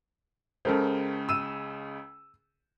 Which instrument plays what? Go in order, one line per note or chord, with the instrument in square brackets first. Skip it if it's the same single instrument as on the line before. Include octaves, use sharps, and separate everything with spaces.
[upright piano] C#2 C#3 [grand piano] A4 A#4 C5
[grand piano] E6 D#7 E7